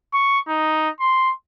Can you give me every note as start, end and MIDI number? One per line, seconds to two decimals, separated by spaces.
0.13 0.40 85
0.48 0.89 63
1.00 1.32 84